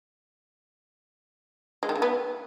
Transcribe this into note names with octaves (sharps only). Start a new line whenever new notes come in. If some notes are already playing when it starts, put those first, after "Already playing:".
G#3
D#3
C#3
B3